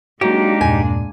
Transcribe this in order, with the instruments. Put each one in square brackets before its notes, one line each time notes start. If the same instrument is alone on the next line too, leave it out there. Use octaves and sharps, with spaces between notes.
[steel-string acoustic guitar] F#3 [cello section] G#3 A#3 D4 [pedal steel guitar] D#4 G4
[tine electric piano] E2 G2 A#2 [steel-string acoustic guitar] G#5